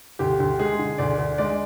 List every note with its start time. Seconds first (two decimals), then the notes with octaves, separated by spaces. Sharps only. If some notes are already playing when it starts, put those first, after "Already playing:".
0.19 D2 G4
0.40 D2
0.59 G#3 G#4
0.79 D3
0.98 D2 D5
1.18 D2
1.38 G#3 D5